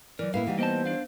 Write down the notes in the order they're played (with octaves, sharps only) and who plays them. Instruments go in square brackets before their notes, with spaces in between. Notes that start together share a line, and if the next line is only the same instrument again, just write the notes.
[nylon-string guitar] E3 [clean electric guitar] F#3 A#4 [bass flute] D5
[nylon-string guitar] A2 A#3 E4 [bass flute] B4 [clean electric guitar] F5
[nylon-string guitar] E3 G3 D#4 [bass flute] F#5
[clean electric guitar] A#3 D#5 A5 [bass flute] B3 [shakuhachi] C5
[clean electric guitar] D4 F5